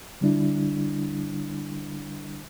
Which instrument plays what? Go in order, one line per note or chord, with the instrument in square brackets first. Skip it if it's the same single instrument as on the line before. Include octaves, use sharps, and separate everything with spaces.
[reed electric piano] D3 G3 D4 E4